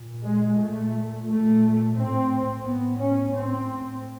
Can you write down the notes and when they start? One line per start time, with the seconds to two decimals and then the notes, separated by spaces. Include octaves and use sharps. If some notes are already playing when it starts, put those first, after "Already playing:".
Already playing: A#2
0.23 G#3
0.58 A#2 A3
1.26 A#2 A3
1.95 A2 C4
2.63 A2 B3
2.98 C#4
3.33 A2 C4